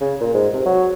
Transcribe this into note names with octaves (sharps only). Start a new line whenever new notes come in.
C#3
A#2
G#2
C3
F#3